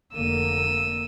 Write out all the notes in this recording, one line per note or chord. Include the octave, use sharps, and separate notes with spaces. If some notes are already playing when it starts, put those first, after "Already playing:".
F1 D3 A#3 E6 D#7